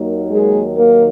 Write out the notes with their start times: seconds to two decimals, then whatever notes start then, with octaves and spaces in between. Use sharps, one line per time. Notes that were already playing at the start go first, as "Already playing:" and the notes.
Already playing: D#2 D#3 F#3 A#3
0.30 G#3 G#4
0.76 A#3 A#4